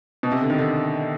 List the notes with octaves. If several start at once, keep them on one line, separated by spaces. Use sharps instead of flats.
B2
C3
D3
D#3
D3